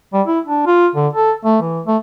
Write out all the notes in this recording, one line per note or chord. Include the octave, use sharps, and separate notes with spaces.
G3
E4
D4
F4
D3
A4
A3
E3
A3